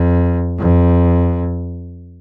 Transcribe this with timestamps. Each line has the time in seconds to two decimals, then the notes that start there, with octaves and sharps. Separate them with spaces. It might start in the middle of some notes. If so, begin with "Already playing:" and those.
Already playing: F2
0.58 F2